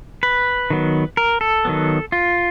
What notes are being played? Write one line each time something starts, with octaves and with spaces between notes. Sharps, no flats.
B4
D#3 F#3 B3
A#4
A4
D#3 F#3 B3
F4